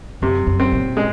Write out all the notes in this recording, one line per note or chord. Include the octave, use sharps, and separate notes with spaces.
F#2 C3
F#2
C4
A#2
G#3